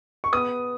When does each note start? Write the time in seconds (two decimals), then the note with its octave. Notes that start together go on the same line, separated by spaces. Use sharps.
0.24 C#6
0.33 B3 D#6